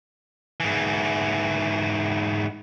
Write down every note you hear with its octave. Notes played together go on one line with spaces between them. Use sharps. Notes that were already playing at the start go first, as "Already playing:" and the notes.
G#2 E3